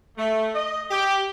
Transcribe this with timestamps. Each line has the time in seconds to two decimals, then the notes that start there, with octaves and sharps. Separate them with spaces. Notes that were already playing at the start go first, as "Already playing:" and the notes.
0.18 A3
0.55 D#5
0.91 G4